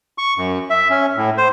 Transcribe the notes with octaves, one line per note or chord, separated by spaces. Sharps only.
C#6
F#2
E5
C#4
A2
C5